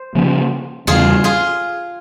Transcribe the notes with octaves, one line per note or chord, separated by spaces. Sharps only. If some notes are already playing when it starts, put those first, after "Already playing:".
Already playing: C5
C#3 F3 A#3 C#4
E2 C#3 G3 F4 G#4
F4 G#4